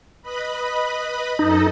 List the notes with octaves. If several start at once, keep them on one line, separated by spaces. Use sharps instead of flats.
B4 D#5 B5
F#2 D#4 A4 D#5